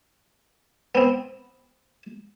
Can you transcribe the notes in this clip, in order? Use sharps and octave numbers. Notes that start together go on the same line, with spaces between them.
B3 C4